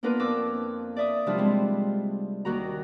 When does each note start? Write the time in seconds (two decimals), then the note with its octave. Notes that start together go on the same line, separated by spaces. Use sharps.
0.03 A#3 B3 D4 F4 A#4 B4
0.20 F2 C4 D4 D6 E6
0.96 D5 E5 D#6
1.26 C3 F3 G3 D4 E4 F4
1.38 G3 G#3 C4
2.45 D#2 D#3 F#4 A#5